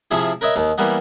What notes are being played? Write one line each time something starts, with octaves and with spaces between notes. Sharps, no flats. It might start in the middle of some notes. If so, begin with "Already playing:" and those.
C3 F3 E4 F4 G#4
A#4 B4 C#5 D#5 E5
D#2 D#3
E3 G3 A#3 B3